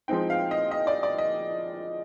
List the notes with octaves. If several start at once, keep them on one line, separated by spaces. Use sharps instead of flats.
F3 G#3 C4 D#4 G5
F5
D#5
D#5
D5
D5
D#5